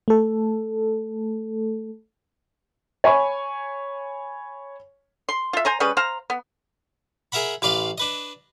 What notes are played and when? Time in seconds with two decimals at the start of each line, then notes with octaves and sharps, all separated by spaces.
0.08 A3 A4
3.04 C#5 G#5 B5 C#6
5.29 C6
5.53 F4 E5
5.65 C5 G#5 A#5
5.80 G3 C#4 G#4 B4
5.97 C5 F5 A#5
6.30 B3
7.32 G#4 A#4 E5 F#5 B5
7.62 A1 B4 D5 F5 C6
7.98 D4 B4 D#5